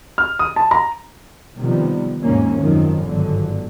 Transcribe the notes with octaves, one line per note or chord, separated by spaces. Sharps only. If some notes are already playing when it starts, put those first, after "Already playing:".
F6
D#6
A5
A#5
C3 D#3 F3 G3 B3
D#2 G#2 C3 A#3 C#4
F#2 C3 D#3 F3
G1 G#2 D3 D#3 F#3